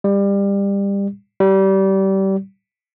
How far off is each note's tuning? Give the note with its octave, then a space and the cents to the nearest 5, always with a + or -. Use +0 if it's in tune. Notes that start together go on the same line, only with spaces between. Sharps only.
G3 +25
G3 -25